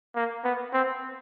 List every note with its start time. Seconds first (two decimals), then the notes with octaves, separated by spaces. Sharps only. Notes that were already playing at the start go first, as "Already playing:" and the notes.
0.15 A#3
0.44 B3
0.73 C4